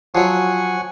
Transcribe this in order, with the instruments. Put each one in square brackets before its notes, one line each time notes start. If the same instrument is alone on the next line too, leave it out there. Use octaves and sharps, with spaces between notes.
[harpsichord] F3 F#3 [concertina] F#5 G#5 C#6